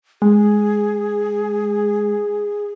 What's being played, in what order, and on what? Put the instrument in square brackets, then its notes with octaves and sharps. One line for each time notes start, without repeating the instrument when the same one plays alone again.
[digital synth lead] G#3 [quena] G#4